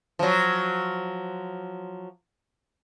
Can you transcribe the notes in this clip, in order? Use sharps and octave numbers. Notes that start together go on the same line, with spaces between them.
F3 F#3